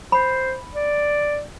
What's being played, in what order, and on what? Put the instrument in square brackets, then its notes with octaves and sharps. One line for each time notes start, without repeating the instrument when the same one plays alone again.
[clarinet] C5 [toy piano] B5
[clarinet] D5